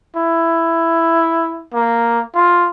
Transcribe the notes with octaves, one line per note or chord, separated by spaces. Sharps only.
E4
A#3
F4